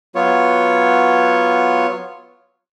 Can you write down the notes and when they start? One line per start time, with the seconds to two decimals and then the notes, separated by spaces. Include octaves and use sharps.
0.15 F#3 B3 F4 C#5